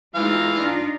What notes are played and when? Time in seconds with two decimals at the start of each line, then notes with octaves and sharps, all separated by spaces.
0.15 E3 G#3 D#4 F4 F5
0.55 D4 D#4 F4